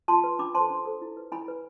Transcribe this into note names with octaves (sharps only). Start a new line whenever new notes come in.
F4 A5 C6
B4
D4 B5 D6
A4 C5 A5 C6
D4
A4 C5
E4
B4
E4 G#5 B5
B4